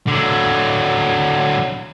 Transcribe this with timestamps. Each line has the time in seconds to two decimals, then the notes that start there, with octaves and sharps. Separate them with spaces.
0.07 D3 F#3